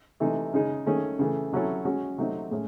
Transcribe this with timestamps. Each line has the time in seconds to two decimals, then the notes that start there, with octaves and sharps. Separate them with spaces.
0.20 C3 E3 A3 D#4
0.54 C#3 G#3 D#4
0.86 D#3 A3 C#4 G#4
1.19 C#3 E3 A3
1.52 C3 F#3 C#4 E4 A4
1.85 G#3 C#4 F#4
2.18 C3 F#3 A3 C4 D#4
2.51 A2 G#3 C#4